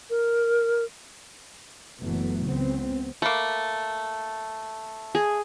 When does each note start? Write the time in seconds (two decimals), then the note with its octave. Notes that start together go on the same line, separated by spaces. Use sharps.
0.10 A#4
1.99 F#1 A#2 E3 F#3 A3 B3
2.46 C#2 C#3 B3 C4
3.22 A3 A#3 B5
5.15 G#4